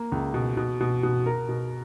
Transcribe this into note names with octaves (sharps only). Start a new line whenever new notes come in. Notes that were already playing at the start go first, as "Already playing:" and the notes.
Already playing: A#3
C#2
B2
B2
B2
B2
A#4
B2